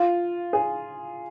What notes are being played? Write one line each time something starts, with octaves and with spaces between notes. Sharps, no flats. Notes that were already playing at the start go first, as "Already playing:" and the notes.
Already playing: F4
G#4